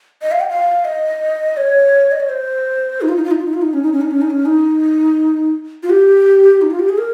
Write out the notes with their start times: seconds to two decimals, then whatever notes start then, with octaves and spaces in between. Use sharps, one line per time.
0.22 D#5
0.31 F5
0.40 G5
0.49 F5
0.85 D#5
1.57 C#5
2.12 D#5
2.20 C#5
2.29 C5
3.01 D#4
3.09 F4
3.16 D#4
3.24 F4
3.31 D#4
3.38 F4
3.46 D#4
3.54 F4
3.62 D#4
3.74 C#4
3.83 D#4
3.93 C#4
4.01 D#4
4.11 C#4
4.22 D#4
4.30 C#4
4.46 D#4
5.83 F4
5.90 G4
6.62 D#4
6.71 F4
6.79 G4
6.89 G#4
6.98 A#4